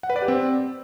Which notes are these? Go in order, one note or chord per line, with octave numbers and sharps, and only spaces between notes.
F#5
B4
D5
G4
C4